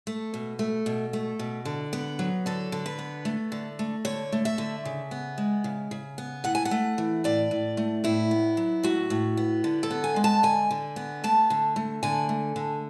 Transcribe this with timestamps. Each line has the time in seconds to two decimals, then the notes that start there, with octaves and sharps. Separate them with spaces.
0.07 A3
0.34 B2
0.59 A3
0.86 B2
1.13 A3
1.39 B2
1.65 D3
1.93 B3
2.19 F#3
2.46 D3 A4
2.72 D3
2.86 B4
2.99 B3
3.25 A3
3.52 D3
3.79 A3
4.05 D3 C#5
4.32 A3
4.45 E5
4.58 D3
4.85 C#3
5.11 B3
5.38 G#3
5.64 C#3
5.91 C#3
6.18 B3
6.44 A2 F#5
6.55 G#5
6.65 F#5
6.71 A3
6.98 E3
7.24 A2 D5
7.51 A2
7.77 A3
8.04 A2 E4
8.31 B3
8.57 F#3
8.83 A2 F#4
9.10 A2
9.37 B3
9.64 D3
9.83 A4
9.90 B3
10.04 G#5
10.16 G#3
10.24 A5
10.43 D3 G#5
10.71 D3
10.96 B3
11.24 A3 A5
11.50 D3
11.76 A3
12.03 D3 G#5
12.29 A3
12.56 D3